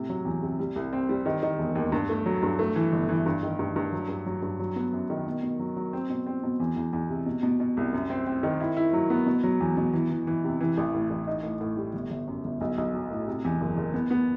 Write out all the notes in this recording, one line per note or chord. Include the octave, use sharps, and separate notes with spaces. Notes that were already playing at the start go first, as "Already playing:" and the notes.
Already playing: A2 C3
F#3
E2
C3
G3
C2
C4
G3
D#3
D#3
E1
D#2
G2
A3
F#3
G2
A3
E3
G1
E3
G2
D#3
G2
G2
F#3
G2
F#3
G2
F#3
B3
F#2
D#3
B2
B2
F#3
F#3
C4
B2
C4
B2
E2
E2
E2
C3
B2
B2
B2
C2
F#2
C4
C4
D#3
E4
E4
F#3
B3
B2
F#3
E2
B2
E3
E3
E3
C3
E3
A1
A2
A1
D#4
A2
A2
G3
G1
G1
F#2
G1
B1
B1
F#3
A2
C3
E2
F#1
F#1
B3
B3